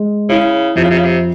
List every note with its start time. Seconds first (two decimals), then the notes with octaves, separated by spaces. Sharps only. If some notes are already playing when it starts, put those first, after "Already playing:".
Already playing: G#3
0.29 C#3 E4
0.75 F2 C3
0.83 C#3
0.90 C3
0.98 C#3
1.05 C3